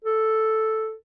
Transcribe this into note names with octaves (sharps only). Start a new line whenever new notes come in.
A4